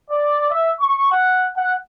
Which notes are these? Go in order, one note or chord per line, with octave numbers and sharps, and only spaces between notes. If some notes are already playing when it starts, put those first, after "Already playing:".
D5
E5
C#6
F#5
F#5